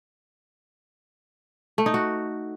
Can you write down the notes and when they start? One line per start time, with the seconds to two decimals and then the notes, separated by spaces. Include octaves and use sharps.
1.78 A3
1.86 D#4
1.94 F#4